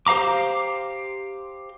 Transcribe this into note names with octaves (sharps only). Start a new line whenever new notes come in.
G4 C5 F5 A#5 D6